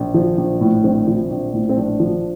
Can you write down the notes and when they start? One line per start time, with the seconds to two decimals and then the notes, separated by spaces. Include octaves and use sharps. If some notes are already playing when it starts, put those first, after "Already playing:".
Already playing: A#1
0.14 F3
0.37 A#1
0.61 A2
0.84 A#1 C4
1.07 F3
1.30 A#1
1.54 A2
1.69 C4
1.77 A#1 D4
2.00 F3